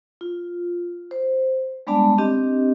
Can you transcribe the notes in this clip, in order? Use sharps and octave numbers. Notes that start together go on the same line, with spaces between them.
F4
C5
G3 G#3 B3 D4 D5 A5
C4 D4 G4 D#5